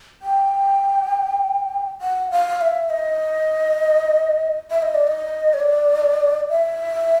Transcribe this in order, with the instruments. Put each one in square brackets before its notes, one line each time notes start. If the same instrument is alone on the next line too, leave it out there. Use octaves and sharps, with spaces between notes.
[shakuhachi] G5
F#5
F5
E5
D#5
E5
D#5
D5
D#5
C#5
D5
E5